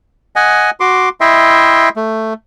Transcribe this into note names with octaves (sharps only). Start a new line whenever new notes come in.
D#5 F#5 G#5
F#4 C6 D6
E4 D#5 E5 G5 C6
A3